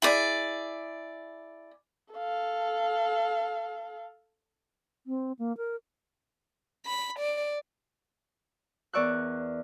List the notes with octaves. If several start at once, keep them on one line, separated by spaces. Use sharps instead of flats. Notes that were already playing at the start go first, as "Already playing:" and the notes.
E4 G#4 D5
A4 F5
C4
A#3
A#4
B5
D5
E2 A#4 D5 C#6 E6 F#6